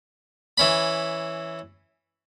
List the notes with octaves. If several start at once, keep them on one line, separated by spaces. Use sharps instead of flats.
E3 C#4 B5